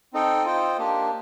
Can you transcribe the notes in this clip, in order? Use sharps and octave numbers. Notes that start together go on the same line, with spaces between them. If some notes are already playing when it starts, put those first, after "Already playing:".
C4 D#4 A4 D#5 G5
F4 C5 D#5 G5
A#3 D4 G4